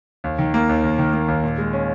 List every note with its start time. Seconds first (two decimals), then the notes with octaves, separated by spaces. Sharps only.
0.24 D#2
0.39 D#3
0.54 A#3
0.69 D#2
0.84 D#2
0.98 D#3
1.13 A#3
1.28 D#2
1.43 A#2
1.58 G#3
1.73 C#4